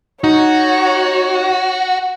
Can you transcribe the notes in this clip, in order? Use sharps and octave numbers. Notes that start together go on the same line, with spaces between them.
D#4 F#4 C#5